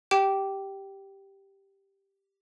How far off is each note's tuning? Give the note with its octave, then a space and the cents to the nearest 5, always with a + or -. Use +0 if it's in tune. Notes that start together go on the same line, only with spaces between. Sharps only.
G4 +0 G5 -15 D6 -5